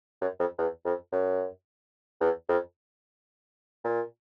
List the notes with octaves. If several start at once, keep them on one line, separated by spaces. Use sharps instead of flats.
F#2
F2
E2
F2
F#2
E2
F2
A#2